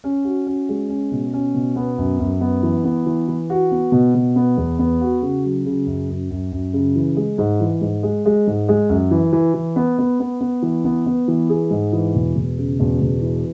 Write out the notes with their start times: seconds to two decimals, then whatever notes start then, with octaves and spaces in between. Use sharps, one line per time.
0.04 C#4
0.24 F#4
0.47 C#4
0.69 G#3
0.89 C#4
1.12 B2
1.33 C#4
1.54 B2
1.76 B3
1.98 F#2
2.20 F#2
2.41 B3
2.63 E3
2.84 B3
3.06 E3
3.28 E3
3.50 F#4
3.71 B3
3.92 B2
4.15 B2
4.36 B3
4.57 E2
4.79 B3
5.01 F#4
5.22 C#3
5.44 F#3
5.66 C#3
5.87 F#2
6.09 F#2
6.31 F#2
6.52 F#2
6.73 C#3
6.96 E3
7.17 G#3
7.38 G#2
7.60 E3
7.81 G#2
8.03 G#3
8.26 G#3
8.47 G#2
8.69 G#3
8.90 F#2
9.11 E3
9.33 E3
9.54 E3
9.76 B3
9.99 B3
10.20 B3
10.41 B3
10.62 E3
10.84 B3
11.06 B3
11.28 E3
11.49 G#4
11.71 G#2
11.93 E3
12.14 E1
12.35 E1
12.58 C#3
12.79 E1
13.01 E1
13.22 E3